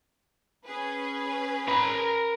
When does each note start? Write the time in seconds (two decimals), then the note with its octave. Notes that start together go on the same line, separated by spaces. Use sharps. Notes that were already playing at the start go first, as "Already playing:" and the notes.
0.65 C#4 G#4 B4
1.68 A#4 B5